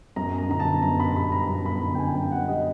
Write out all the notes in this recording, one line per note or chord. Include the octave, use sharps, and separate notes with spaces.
F#2 A#5
A#5
D3 A#5
A5
F#2 A#5
B5
G3 B5
A#5
F#2 A#5
B5
D3 A#5
G5
G#5
F#2 G5
F#5
G3 D#5